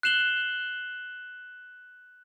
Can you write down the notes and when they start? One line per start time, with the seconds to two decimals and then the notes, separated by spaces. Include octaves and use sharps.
0.03 F#6 C7 E7 F#7 G7